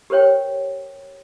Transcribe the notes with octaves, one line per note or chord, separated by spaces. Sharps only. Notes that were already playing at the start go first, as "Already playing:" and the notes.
G4 A#4 C5 C#5 G5